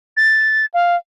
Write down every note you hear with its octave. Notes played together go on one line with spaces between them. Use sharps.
A6
F5